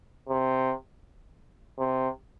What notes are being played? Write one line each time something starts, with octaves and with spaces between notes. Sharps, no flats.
C3
C3